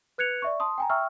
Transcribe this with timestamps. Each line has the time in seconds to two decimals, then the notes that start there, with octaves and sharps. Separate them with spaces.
0.18 B4 F#6 G#6 C#7 F7
0.42 D5 E5 C#6
0.60 A5 C6 D#6
0.78 G5 G#5 A#5
0.90 E5 G5 C#6 E6 F6